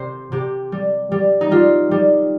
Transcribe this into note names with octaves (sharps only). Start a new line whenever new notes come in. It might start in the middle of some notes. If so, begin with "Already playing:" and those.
Already playing: C3 C5
C3 G4
G3
G3
D#4
G3 F4
G3